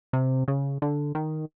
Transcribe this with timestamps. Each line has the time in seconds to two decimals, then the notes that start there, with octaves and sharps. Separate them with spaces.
0.13 C3
0.48 C#3
0.82 D3
1.15 D#3